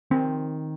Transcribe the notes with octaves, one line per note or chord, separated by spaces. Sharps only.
D#3 C4